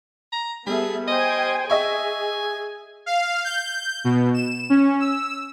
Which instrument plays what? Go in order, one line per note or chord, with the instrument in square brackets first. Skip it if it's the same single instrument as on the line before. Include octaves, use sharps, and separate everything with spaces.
[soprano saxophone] A#5
[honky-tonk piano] G3 [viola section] B3 A4 E5 [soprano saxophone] G#4
[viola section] C5 G5 G#5 [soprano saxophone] D#5
[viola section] G#4 [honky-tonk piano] D#5 E5 C#6 [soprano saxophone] G#5
[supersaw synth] F5
G6
B2
E7
C#4
E6